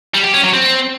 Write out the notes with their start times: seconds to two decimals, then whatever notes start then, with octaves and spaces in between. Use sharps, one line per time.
0.14 G3
0.24 G4
0.34 C#4
0.44 F#3
0.53 C4